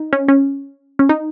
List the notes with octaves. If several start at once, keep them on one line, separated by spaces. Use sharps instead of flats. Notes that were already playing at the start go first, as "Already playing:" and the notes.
Already playing: D#4
C#4
C#4
C#4
D#4